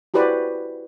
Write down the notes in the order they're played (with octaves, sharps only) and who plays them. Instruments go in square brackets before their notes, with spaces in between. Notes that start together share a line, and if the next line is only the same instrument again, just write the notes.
[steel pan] E4 F#4 G4 B4 C5 D5